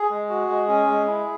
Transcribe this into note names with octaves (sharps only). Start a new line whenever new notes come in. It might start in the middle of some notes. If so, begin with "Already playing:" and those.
Already playing: G#4
G#3
F#4
G#3
C#4
G#3
E4